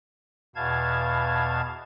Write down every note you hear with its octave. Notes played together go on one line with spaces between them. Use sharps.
E2 B2 F5 A5 G#6